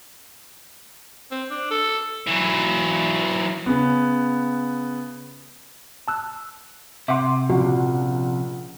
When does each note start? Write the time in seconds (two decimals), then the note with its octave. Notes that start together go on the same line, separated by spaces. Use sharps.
1.31 C4
1.51 D4
1.71 A4
2.27 E3 F#3
3.66 C#3 B3
6.08 A5 E6 F#6
7.08 C3 E5 F#5 C6 D6
7.50 A#1 C#3 F#4 F#5